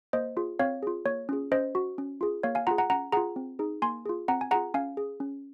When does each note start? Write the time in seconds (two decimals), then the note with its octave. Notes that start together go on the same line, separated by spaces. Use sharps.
0.13 A#3 C5 D#5
0.37 F4 G#4
0.59 C4 C#5 F5
0.83 F4 G#4
1.05 A#3 C#5
1.29 C#4 F4 G#4
1.52 C#4 C5 D#5
1.75 F#4
1.98 C#4
2.21 F4 G#4
2.43 A#3 C#5 F5
2.55 F5 G#5
2.67 F4 G#4 F#5 A#5
2.78 F#5 A#5
2.90 C#4 F#5 A#5
3.12 F4 G#4 F#5 A#5
3.36 C4
3.59 D#4 G#4
3.82 A#3 G#5 C6
4.06 F4 G#4
4.28 C4 F#5 A#5
4.41 G#5
4.51 F4 G#4 F#5 A#5
4.74 C#4 F5 G#5
4.97 G#4
5.20 C#4